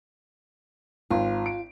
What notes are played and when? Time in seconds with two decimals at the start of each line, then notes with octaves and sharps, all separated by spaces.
1.11 G#1 F4
1.46 D7